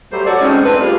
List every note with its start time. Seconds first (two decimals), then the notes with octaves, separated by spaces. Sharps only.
0.13 F#3 G3 A3 C5
0.27 F#4 A4 C#5 D5
0.41 A2 G#3 C4 C#4 D#4
0.65 A3 C4 D4 B4
0.81 A2 G3 G#3 F4